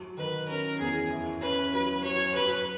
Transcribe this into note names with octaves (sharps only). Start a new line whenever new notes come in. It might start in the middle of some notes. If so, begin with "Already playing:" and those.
Already playing: F#3
D#3 B4
C#4 A#4
E2 G#4
E4
C#4 B4
F#3 B4
F#3 C#5
F#3 B4